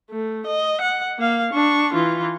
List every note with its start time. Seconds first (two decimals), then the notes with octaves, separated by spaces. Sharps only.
0.10 A3
0.46 D#5
0.81 F#5
1.19 A#3 F5
1.53 D4 C#6
1.93 E3 F4